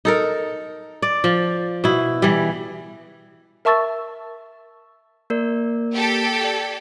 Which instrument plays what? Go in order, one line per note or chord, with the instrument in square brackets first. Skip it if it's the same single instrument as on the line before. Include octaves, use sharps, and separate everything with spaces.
[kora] D#4 A4 A#4
D5
F3
B2 E4
E3 G3
[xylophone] A#4 E5 A5 C#6 E6 A6
[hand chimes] A#3 A#4 D5
[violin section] G4 A4
[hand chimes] D5